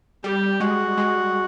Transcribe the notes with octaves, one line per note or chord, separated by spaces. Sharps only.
G3 G4
G#3 F#4
G#3